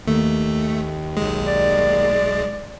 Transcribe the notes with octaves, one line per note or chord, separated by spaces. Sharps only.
D#2 A3
B1 G#3
D5